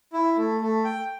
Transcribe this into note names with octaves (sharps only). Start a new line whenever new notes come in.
E4
A3
A3
G5